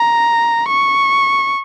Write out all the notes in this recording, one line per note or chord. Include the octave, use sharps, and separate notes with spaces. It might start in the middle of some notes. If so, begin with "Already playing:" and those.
Already playing: A#5
C#6